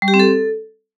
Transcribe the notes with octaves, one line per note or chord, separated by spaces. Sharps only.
G3
G4
C4
A4